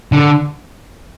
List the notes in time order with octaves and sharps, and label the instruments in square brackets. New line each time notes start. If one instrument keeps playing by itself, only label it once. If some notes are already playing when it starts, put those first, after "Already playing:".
[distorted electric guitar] D3